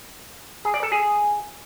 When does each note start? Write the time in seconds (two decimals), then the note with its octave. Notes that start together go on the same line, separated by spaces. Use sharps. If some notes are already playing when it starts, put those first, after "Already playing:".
0.65 G#4
0.74 D5
0.83 A4
0.92 G#4